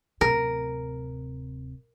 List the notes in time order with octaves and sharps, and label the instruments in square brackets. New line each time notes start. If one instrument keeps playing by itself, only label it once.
[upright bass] D1 C3 [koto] A#4